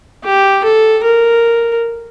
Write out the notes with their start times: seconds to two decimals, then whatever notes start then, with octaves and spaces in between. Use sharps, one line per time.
0.24 G4
0.63 A4
1.03 A#4